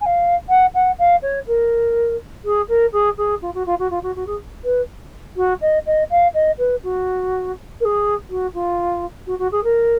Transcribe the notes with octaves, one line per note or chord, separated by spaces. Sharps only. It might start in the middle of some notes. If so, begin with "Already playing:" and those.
G#5
F5
F#5
F#5
F5
C#5
A#4
G#4
A#4
G#4
G#4
F4
F#4
F4
F#4
F4
F#4
F#4
G#4
B4
F#4
D#5
D#5
F5
D#5
B4
F#4
A#4
G#4
F#4
F4
F#4
F#4
G#4
A#4